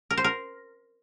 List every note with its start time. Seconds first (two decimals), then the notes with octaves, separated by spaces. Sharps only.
0.11 A#4
0.17 C5
0.24 A#4